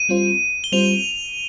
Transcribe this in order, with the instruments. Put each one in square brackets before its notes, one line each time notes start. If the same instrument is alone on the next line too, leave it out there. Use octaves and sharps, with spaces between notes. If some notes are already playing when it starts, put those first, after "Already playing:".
Already playing: [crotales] D#7
[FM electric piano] G3 C4 F4 C5
[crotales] G7
[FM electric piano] G3 C4 F4 C5 [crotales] F7